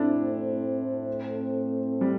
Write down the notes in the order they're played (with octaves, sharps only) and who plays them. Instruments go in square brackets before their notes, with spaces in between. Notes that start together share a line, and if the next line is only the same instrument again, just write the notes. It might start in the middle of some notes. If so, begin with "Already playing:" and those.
Already playing: [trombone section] A2 A3 C4 A4 C5 [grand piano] D4 E4
[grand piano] G3